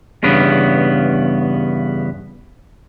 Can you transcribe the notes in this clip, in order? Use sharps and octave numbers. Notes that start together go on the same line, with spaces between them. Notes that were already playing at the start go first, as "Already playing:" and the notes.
E2 G2 C#3 B3